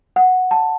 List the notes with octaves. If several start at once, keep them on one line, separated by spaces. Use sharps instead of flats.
F#5
A5